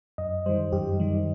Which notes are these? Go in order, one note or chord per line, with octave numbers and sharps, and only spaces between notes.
F#2 D#5
D#3 G3 C5
F#2 G4
D#3 G3